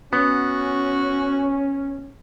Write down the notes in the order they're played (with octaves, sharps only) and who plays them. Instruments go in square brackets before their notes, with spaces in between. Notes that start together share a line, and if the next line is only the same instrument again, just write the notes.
[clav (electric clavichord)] B3 [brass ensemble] C#4 [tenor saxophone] F#4